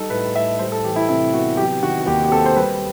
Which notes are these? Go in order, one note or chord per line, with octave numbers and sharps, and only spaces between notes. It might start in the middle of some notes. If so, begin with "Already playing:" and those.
Already playing: G3 D#4 A4
A2 B4
A2 E5
G3 C5
A4
E3 G4
E4
C3 E4
B3 F#4
F#3 G4
D#3 F#4
F#4
D#2 G4
G4
C4 A4
C5
G3 B4